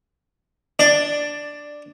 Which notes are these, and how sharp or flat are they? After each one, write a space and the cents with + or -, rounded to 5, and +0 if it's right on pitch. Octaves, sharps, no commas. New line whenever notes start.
D4 +0 D5 +10